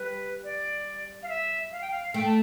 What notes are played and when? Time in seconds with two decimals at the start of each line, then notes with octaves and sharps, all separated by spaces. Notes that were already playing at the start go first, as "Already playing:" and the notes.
Already playing: G3 B4
0.44 D5
1.23 F5
1.28 E5
1.71 F5
1.81 G5
1.91 F5
2.14 A3 G5
2.24 A5